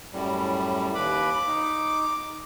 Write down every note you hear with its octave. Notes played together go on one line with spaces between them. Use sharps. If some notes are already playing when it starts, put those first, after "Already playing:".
F#2 A2 G3
D#2 B4 B5 D6
D#4